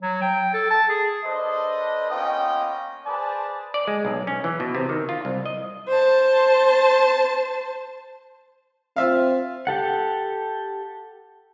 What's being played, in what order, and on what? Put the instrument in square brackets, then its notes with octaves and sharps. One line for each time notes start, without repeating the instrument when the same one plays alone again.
[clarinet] F#3
G5
A4
A5
G#4
[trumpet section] D4 A4 B4 C5 D#5
A#3 B3 C#4 F4 D#5 G5
G#4 B4 C5 D5 A5
[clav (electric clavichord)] D5
G#3
B1
C#4
E3
B2
C3
D#3
F4
C2
D#5
[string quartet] C5 A5
[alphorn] C4 [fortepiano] F4 E5 F5
[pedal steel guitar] G4 A4 F#5